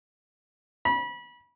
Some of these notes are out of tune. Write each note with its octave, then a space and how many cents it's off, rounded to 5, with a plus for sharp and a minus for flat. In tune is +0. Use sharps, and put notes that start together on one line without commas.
B5 -30